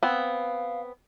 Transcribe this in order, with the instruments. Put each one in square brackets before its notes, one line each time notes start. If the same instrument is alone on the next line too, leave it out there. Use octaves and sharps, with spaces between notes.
[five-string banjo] B3 C4 [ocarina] F5